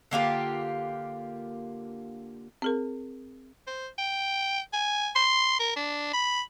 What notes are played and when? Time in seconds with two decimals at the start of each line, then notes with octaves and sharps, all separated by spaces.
0.11 D3 A#3 F4 G4
2.62 C4 G#4 A#4
3.67 C5
3.98 G5
4.73 G#5
5.15 C6
5.60 A#4
5.76 D4
6.13 B5